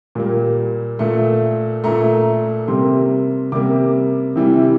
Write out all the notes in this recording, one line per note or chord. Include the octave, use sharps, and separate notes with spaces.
A#2 G3 A#3
A#2 A3
A#2 A3 A#5
C3 G3 A#3 C6
C3 G3 A#3 D6
C3 E3 G3